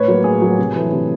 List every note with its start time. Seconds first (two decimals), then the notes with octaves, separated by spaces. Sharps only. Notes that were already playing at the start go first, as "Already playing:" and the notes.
Already playing: A2 B4 C#5
0.08 F#3 A#3
0.24 A2 G#4
0.42 F#3 A#3
0.58 C3
0.76 E3 A3
0.92 C3